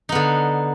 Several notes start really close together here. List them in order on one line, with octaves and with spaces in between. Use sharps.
D#4 B3 D3